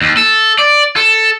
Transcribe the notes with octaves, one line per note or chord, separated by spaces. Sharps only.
D#2
A4
D5
A4